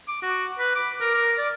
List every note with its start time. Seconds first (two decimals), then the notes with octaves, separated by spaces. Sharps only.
0.08 D6
0.22 F#4
0.59 B4
0.75 D6
1.00 A#4
1.14 A#4
1.38 D5